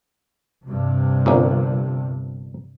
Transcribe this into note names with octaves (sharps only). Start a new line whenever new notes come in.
G2 C3
G1 C2 A#2